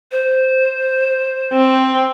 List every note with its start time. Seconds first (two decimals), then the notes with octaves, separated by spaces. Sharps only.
0.12 C5
1.53 C4